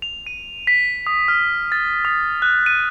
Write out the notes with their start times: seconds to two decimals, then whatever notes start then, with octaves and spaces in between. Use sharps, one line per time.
0.02 F7
0.27 D#7
0.67 B6
1.07 D#6
1.28 F6
1.72 A6
2.05 D#6
2.42 F#6
2.66 D#7